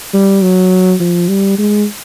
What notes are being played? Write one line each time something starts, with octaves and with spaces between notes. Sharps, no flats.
G3
F#3
F3
G3
G#3